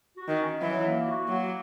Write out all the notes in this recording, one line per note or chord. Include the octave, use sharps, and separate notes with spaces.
F#4
D#3
C#4
E3 F#3
A#3
F#4
F#3 A#3